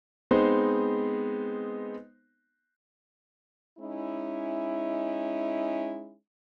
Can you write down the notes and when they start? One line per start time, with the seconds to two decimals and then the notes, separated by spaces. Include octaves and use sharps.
0.31 G#3 B3 C4 D#4 C5
3.78 G#3 C#4 D#4 E4